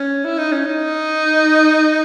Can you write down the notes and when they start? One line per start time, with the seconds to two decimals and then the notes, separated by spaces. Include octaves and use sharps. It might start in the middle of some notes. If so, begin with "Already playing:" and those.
Already playing: C#4
0.25 E4
0.38 D#4
0.52 C#4
0.65 D#4